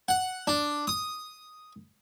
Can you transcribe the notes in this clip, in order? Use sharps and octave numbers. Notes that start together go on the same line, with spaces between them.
F#5
D4
D#6